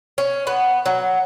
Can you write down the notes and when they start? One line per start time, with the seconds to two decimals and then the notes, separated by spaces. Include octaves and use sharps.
0.18 C#4
0.47 B3
0.86 F#3